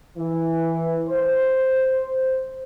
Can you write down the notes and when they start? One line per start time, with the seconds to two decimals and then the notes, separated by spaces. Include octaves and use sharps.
0.18 E3
1.10 C5